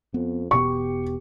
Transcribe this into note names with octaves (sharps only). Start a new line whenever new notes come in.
F2 B3
E1 B2 B3 G4 C#6